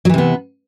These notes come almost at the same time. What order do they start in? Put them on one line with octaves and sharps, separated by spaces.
F#3 E3 C3 B3